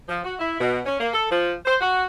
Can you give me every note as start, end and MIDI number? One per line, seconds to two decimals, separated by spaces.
0.08 0.21 53
0.24 0.35 66
0.39 0.59 64
0.60 0.81 47
0.85 0.98 61
1.00 1.08 58
1.14 1.25 69
1.30 1.52 53
1.65 1.75 72
1.81 2.06 66